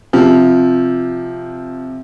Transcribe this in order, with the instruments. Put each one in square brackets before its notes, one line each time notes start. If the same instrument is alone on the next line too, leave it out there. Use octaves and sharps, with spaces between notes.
[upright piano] C3 [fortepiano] F3